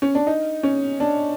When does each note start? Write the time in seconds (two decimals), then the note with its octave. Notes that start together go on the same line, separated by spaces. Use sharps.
0.02 C#4
0.15 D4
0.27 D#4
0.63 C#4
1.00 D4